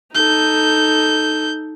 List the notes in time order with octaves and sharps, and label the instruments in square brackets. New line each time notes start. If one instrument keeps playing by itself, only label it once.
[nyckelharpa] D#4 A4 [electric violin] G6